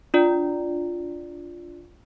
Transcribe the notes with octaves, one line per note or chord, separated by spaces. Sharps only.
D4 F4 D5